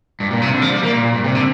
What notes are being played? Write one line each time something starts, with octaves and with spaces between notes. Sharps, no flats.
G2
A#2
C3
D3
F3
G3
A#3
A#2
A#2
G2
C3
D3